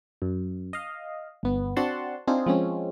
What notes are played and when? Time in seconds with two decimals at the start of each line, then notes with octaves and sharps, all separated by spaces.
0.22 F#2
0.73 D#5 F5
1.43 G1 B3
1.76 C4 D4 F#4 F#5 A5 C6
2.27 C4 D4 D#4 F4 G#4
2.46 F3 G#3 C4 C#4